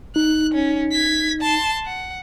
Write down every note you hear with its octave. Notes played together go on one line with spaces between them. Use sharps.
D#4 F#6
C#4
G#6 B6
A5 C6
F#5